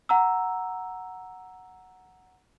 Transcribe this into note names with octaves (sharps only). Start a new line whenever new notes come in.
F#5 A#5 E6